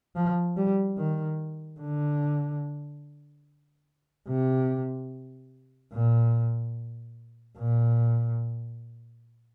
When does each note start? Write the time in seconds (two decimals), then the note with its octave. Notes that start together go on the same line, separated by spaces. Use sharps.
0.16 F3
0.57 G3
0.97 D#3
1.80 D3
4.28 C3
5.93 A#2
7.57 A#2